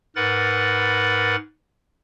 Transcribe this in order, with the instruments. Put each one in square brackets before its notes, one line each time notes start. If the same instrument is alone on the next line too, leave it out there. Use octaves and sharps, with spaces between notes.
[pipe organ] G#2 A#4 B4 F#5 B5 A6